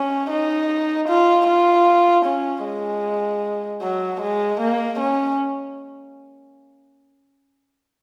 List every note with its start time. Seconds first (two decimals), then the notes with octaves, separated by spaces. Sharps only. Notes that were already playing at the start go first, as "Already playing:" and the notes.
Already playing: C#4
0.31 D#4
1.09 F4
1.47 F4
2.25 C#4
2.65 G#3
3.83 F#3
4.21 G#3
4.60 A#3
5.00 C#4